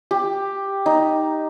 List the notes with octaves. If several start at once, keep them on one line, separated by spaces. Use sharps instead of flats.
G4
D#4